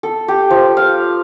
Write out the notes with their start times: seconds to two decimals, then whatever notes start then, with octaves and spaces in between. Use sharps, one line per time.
0.03 A4
0.28 G4
0.50 F3
0.77 F5